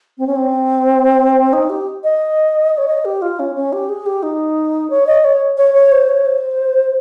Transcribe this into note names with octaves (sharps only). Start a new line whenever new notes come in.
C4
C#4
C4
D#4
G4
D#5
C#5
D#5
G4
F4
C#4
C#4
G4
G#4
G4
D#4
C#5
D#5
C#5
C#5
C#5
C5
C#5
C5